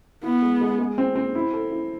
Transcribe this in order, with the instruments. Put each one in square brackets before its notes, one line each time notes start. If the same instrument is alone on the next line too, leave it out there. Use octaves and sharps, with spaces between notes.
[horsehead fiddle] B3 [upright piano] E4
[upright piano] G#3
G#3
G#3
C4
C4
E4
A4
E4